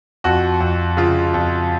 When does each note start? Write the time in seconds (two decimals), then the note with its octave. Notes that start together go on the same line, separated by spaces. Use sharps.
0.24 F2 F#4
0.60 F2
0.97 C#3 F4
1.34 F2